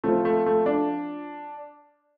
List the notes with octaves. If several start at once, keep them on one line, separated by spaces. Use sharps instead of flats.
F3 A3 C4 F4
A3
A3
D4